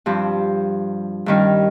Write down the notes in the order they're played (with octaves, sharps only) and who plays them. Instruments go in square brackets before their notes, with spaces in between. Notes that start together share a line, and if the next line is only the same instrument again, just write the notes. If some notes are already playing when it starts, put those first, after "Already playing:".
[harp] G2 F3 C4
G2 D#3 G3 C#4